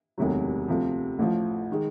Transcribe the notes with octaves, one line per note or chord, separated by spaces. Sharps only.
E1 D2 C3 D#3 F#3
D2 C3 F3
A1 A2 F3
D#3 G#3